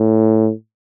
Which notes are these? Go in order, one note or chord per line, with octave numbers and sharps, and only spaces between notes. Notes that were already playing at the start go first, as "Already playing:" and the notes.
Already playing: A2